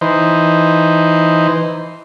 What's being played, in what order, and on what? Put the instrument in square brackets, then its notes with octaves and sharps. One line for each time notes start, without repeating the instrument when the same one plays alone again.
[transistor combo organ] E3 D#4 C5